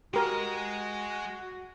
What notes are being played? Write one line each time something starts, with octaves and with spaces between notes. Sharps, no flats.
G#3 F#4 G4 A#4 D#5